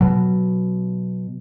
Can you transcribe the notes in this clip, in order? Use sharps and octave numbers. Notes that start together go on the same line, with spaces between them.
B2 F#3